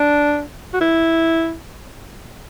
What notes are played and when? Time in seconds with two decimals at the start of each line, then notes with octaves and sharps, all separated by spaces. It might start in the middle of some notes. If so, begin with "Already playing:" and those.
Already playing: D4
0.73 F#4
0.81 E4